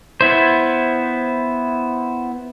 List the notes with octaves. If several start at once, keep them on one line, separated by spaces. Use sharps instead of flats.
B3 E4 C5